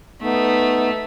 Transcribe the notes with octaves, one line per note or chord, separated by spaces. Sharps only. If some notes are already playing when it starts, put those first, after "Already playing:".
A3 B3 D#4